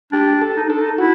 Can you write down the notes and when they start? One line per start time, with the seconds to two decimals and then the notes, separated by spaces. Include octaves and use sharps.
0.12 D4 G4
0.41 A4
0.56 D#4
0.68 D4 A4
0.81 D#4
0.98 E4 F#4